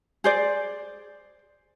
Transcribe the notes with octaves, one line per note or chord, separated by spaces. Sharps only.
G#4 C5 D5